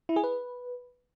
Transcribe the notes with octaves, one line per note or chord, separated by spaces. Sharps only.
E4
G#4
B4